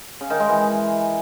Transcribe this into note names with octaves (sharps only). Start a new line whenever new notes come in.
C#3
D#3
G#3
E3